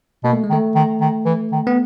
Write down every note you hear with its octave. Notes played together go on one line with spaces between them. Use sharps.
B2 A#3
A3
G#3
D#3
A3
D#3
D#3
E3
D#3
B3